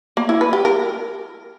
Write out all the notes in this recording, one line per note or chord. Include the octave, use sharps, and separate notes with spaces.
A#3
E4
B4
G4
A#4